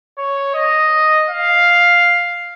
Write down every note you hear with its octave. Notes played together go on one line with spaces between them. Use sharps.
C#5
D#5
F5